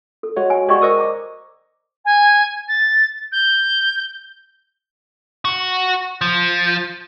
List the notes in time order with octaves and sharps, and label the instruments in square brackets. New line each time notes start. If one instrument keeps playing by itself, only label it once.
[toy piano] A4
[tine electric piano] G#3 F#4 C#5
[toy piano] G#5
[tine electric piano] G#3 F#4 G4 [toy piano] D5 D#5 C#6
[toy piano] A#4 C5 [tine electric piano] D#5 C#6 D#6
[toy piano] A#5 D6
[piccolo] G#5
A6
G6
[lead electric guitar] F#4
F3